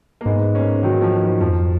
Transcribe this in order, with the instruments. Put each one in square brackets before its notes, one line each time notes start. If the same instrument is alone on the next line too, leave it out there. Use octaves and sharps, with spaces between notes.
[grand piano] A#3
[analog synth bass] G#2 [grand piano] G#3 B3
[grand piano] A#3 C#4
D#3 F#3
F3
F3
[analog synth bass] F2 [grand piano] F3